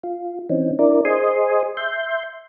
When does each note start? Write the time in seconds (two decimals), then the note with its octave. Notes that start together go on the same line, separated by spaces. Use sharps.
0.04 F4
0.50 E3 C4 C#4 D#4
0.79 D4 E4 A#4 D5
1.05 G#4 C5 D#5 G#5 C6 D#6
1.77 E5 C6 G6